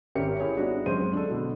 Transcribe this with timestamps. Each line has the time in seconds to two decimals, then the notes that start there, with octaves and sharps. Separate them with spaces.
0.15 G#1 C#4 G4 A#4 E5 C#7
0.40 E4 G4 G#4 C#5
0.57 G3 B3 D4 D#4 F#4
0.86 F#2 G#3 C4 C5 C6 D#7
1.13 D4 A4
1.29 B2 D3